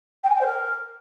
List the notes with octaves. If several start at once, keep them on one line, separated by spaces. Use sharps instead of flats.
G5
G#5
G5
C5
A#4